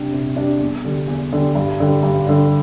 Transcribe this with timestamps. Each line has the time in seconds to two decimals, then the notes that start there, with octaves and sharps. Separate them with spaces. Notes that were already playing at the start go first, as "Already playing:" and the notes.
Already playing: C3 G3 D4 G4
0.13 C3
0.36 G3 D4 G4
0.60 E2
0.85 D3 G3
1.08 E2
1.33 D3 G3
1.55 G2
1.80 D3 G3
2.03 G2
2.27 D3 G3